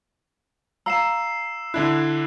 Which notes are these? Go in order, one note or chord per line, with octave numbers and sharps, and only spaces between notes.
F5 A#5 E6 C7 E7
D3 D4 E4 F#6